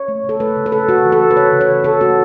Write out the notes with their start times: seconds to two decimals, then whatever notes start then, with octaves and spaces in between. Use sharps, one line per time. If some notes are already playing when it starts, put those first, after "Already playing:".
Already playing: C#5
0.08 A3
0.24 C#3 A4
0.40 A3 B4
0.56 C#3
0.66 B4
0.72 A3 A4
0.88 C#3 F#4
1.05 E3
1.12 A4
1.21 A3
1.31 B4
1.36 C#3 C#5
1.52 C#3
1.61 C#5
1.69 E3
1.84 C#3 A4
2.01 A3 F#4